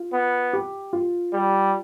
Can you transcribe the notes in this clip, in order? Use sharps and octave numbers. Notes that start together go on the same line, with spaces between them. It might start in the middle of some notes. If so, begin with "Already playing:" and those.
Already playing: F4
B3
G4
F4
G3